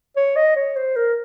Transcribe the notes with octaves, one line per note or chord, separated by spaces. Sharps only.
C#5
D#5
C#5
C5
A#4